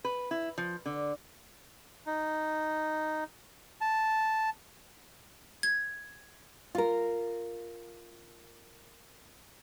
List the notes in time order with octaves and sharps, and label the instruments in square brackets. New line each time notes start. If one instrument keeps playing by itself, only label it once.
[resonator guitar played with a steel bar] B4
E4
F3
D3
[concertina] D#4
A5
[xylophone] G#6
[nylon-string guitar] F4 A#4